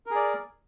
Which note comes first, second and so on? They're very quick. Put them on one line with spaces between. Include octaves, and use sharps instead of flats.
A#4 G#4 D5